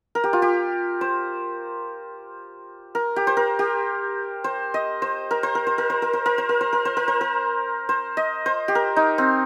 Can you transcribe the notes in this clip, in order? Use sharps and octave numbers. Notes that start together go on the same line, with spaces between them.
A#4
G4
F4
G4
C5
A#4
G4
C5
A#4
G4
C5
D#5
C5
A#4
C5
A#4
C5
A#4
C5
A#4
C5
A#4
C5
A#4
C5
A#4
C5
A#4
C5
A#4
C5
D#5
C5
G4
A#4
D#4
C4